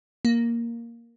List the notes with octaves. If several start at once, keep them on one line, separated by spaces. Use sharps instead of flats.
A#3